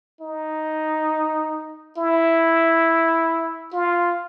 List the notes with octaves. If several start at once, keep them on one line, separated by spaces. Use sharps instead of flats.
D#4
E4
F4